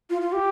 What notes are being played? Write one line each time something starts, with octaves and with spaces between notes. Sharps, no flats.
F4
F4
G4